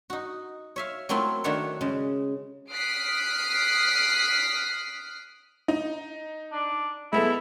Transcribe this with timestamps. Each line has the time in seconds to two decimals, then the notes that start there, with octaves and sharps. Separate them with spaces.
0.10 D#4 F#4
0.76 C#5 E5 F5
1.09 F#3 A3 A#3 C4 E4 F4
1.44 D#3 A3 D4 F#4 C#5
1.81 C#3 G#3
2.73 D#6 F6 F#6 B6 C7 D7
5.68 D#4
6.52 D4
7.13 G#3 B3 E4 A4